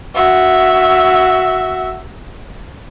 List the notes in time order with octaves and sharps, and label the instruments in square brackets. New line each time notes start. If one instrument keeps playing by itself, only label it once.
[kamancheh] F#4 E5